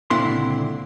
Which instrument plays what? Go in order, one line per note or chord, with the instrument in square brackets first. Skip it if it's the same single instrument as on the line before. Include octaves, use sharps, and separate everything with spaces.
[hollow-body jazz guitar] C#2 A#2 D3 C4 E4 C6